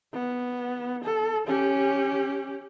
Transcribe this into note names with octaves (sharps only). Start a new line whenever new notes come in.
B3
A4
C#4 G4